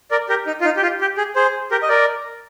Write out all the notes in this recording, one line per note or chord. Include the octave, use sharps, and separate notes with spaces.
A#4 D5
G4 A#4
D#4
F4
D#4
G4
F4
G4
G#4
G#4 C5
G4 A#4
D#5
A#4 D5